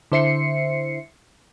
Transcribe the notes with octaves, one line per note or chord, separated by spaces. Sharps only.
D3 E4 C5 E5 C7 C#7